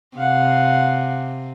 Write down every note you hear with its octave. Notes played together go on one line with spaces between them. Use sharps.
C3 F5 F#5